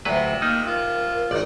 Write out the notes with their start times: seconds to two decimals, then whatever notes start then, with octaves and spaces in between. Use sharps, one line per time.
0.05 D2 C3 F3 F#3 B4 E5
0.42 A#3 D#4 D#5 F6
0.67 F4 A#4
1.31 G#1 D#4 D5